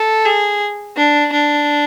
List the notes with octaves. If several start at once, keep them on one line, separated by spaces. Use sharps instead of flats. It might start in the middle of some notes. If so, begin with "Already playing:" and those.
Already playing: A4
G#4
D4
D4